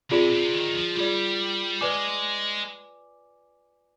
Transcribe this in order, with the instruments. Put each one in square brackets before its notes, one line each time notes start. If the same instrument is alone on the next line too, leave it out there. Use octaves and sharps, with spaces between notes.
[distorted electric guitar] C3 [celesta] F4 G#4 D5
[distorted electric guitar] C3
D#3
F3
[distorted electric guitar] G3 [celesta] F4 G#4 D5
[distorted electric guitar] G#3 [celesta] B4 D5 G#5 D6